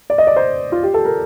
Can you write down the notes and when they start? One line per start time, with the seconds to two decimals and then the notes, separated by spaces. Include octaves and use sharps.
0.10 D5
0.18 D#5
0.27 D5
0.36 C5
0.72 F4
0.83 G4
0.94 A4
1.05 A#4